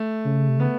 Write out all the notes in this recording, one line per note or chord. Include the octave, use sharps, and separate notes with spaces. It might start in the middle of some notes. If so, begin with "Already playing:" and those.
Already playing: A3
C#3
C3
C#3 B3